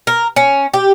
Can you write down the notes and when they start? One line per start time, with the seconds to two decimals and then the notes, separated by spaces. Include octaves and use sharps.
0.07 A#4
0.36 C#4
0.74 G4